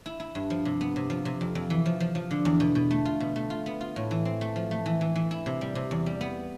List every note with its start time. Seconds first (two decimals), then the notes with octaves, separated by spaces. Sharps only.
0.06 E4
0.20 E4
0.35 G2
0.50 F3
0.65 C3
0.81 B3
0.96 C3
1.10 F3
1.25 C3
1.41 F2
1.55 F2
1.70 E3
1.86 F3
2.00 F3
2.15 F3
2.31 D3
2.45 E2
2.60 B2
2.75 B2
2.91 A3
3.05 F4
3.20 B2
3.36 A3
3.50 F4
3.66 B3
3.81 F4
3.96 A2
4.11 E3
4.25 C4
4.41 A3
4.56 F3
4.71 A3
4.86 E3
5.01 E3
5.16 E3
5.31 E4
5.46 C3
5.61 G3
5.75 C3
5.91 E2
6.06 G3
6.21 B3